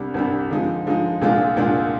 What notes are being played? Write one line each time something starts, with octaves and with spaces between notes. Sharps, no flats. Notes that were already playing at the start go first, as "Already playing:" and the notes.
Already playing: C2 C3 G3 D4
C2 C3 G3 D4
D3 F3 G#3 D#4
D3 F3 G#3 D#4
C2 A#2 G#3 D4 F4
C2 A#2 G#3 D4 F4